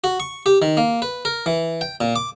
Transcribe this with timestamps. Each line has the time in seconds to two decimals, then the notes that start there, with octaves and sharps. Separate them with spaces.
0.04 F#4
0.20 C#6
0.46 G4
0.62 D#3
0.77 A#3
1.02 B4
1.25 A#4
1.46 E3
1.81 G5
2.01 A#2
2.16 D6